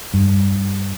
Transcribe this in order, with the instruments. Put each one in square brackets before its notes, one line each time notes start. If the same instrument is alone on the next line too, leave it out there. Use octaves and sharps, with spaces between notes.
[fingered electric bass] G2